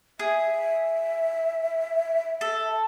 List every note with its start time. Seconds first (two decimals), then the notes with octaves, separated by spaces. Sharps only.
0.19 G#4 E5
2.41 A4